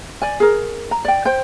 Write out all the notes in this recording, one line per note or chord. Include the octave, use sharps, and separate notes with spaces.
D5 G#5
G#4 A#4
A#5
D5 G5
C5 G5